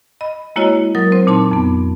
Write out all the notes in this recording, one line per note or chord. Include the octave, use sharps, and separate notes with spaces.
D#5 B5
G#3 A#3 E4 F#4 C#5 D#5
F#3 A#4 D#6 A6
C4 C5
A#2 D#4 A5 C6 D6
F2 B3